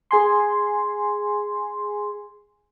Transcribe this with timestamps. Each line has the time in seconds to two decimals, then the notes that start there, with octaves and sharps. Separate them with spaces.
0.11 G#4 G#5 C6